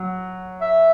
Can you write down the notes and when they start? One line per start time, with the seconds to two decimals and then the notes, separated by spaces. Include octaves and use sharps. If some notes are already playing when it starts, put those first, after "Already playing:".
Already playing: F#3
0.61 E5